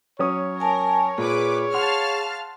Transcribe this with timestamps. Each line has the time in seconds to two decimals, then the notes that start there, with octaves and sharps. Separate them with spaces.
0.19 F#3 C#4 C#5 D#6
0.60 A#4 G#5 A5
1.18 A#2 G#4 B4 D6
1.74 F5 F#5 A5 C6 F6